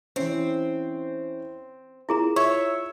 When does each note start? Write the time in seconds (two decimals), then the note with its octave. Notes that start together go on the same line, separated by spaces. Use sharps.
0.16 E3 C4 C#4
2.09 E4 F4 G#4 A#4 A#5
2.36 C#5 E5 C#6